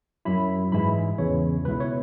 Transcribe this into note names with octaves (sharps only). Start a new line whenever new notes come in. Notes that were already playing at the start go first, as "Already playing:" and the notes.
F#2 F#3 E4 B5
G#2 E3 G#3 E4 B5
E2 C#3 E3 C#5
C#2 B2 B3 E4 B4
C#5